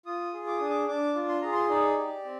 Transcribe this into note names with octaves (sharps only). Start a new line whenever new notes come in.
F4 D#6
G#4
D6
D4 D#6
D6
D4 D6
F4
C6
G#4 A#5
C6
D#4 D5
G4
C4